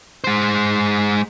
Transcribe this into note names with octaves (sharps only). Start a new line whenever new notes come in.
G#3 C5